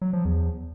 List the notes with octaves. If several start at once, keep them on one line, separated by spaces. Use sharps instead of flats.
F#3
F3
E2